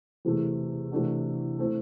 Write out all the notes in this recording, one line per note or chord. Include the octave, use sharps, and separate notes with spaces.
E2 C3 E3 A3
C3 E3 A3 D4 F#4
A3 C4 E4